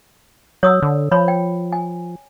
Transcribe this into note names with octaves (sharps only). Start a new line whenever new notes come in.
F#3 C#5 D#6 E6
D3
F3 C#5 B5
G5
G#5